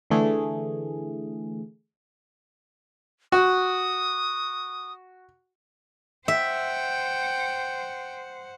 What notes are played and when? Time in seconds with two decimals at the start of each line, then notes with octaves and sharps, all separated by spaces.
0.10 D3 E3 A3 G#4
3.32 F#4 D#6
6.28 C5 E5 F#5 G5